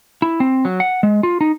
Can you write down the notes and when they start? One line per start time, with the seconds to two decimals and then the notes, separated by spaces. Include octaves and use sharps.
0.22 E4
0.40 C4
0.65 F#3
0.80 F#5
1.03 G#3
1.23 F4
1.41 D#4